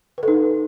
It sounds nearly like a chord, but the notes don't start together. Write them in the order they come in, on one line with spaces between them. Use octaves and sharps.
B4 A4 D#4